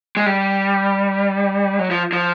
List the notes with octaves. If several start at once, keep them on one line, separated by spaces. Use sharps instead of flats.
G#3
G3
F#3
F3
F3